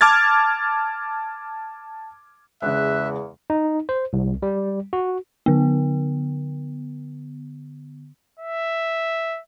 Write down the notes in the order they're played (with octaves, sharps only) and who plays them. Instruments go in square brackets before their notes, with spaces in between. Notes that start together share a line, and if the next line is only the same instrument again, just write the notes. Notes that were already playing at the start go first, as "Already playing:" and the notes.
[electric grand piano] A5 D6 F6 G#6 A6
[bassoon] E2 [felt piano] C#3 G#3 [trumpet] E5 [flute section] F#6
[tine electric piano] D#4
C5
C2
G3
F#4
[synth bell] D3 B3
[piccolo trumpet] E5